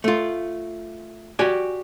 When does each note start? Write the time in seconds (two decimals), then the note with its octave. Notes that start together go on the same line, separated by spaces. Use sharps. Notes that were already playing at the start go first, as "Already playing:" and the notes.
0.04 A3 F4
1.39 F#4 G4 D5 G#5